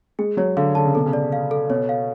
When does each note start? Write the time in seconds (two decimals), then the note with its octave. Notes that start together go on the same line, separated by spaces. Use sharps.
0.19 G#3 G#4
0.37 F#3 C#5
0.57 D3 F5
0.75 D3 A5
0.85 C#3
0.95 B2 A4
1.06 C#3
1.13 D5
1.32 F5
1.51 A4
1.70 B2 C#5
1.89 F5